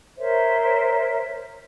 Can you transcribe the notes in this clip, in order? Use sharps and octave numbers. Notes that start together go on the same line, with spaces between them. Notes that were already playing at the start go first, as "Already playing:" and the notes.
A#4 C5 C#5 E5